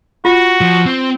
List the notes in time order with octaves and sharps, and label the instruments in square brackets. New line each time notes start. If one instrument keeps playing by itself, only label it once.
[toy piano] F4 [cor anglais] F#4
[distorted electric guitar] F3
C4